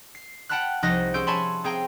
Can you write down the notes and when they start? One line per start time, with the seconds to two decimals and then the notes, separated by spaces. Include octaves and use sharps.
0.15 C7
0.49 F#5 G5 A5 B5 F6 F#6
0.83 C2 F3 D#4 D#5 F#6 A#6
1.14 C#4 G#4 C6 E6 G6 D7
1.27 C#5 E5 G#5 A5 B5 C6
1.64 C4 G#4 F5 G5 A#5